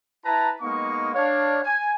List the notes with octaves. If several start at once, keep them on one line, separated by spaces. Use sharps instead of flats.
E4 B4 A5 A#5
G#3 A#3 B3 D#4 F5 C#6
D4 C#5 F5
G#5